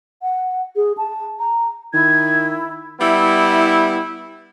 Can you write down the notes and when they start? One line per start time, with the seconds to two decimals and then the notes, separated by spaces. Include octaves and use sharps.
0.22 F#5
0.76 G#4
0.97 A5
1.39 A#5
1.93 D#3 E4 G#6
3.00 G3 B3 E4